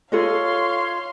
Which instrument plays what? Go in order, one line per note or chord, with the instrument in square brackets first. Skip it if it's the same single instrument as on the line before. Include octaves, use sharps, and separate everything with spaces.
[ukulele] F4 A4 D#5 [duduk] C#5 [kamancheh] F5 C6